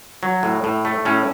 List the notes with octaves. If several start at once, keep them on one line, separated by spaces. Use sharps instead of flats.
F#3
A2
A2
A3
A2 C#4